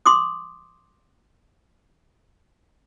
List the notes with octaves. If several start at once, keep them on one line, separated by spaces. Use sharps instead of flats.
C6 D6 D#6